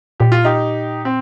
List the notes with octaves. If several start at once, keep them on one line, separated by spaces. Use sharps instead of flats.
A#2 G4
F4
D#4 G4
C4